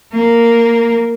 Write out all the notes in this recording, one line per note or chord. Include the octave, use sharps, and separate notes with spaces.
A#3